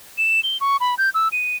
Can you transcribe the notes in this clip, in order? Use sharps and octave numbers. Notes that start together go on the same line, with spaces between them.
E7
G7
C#6
B5
G6
E6
D#7